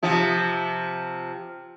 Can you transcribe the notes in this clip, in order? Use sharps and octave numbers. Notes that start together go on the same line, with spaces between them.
C3 F3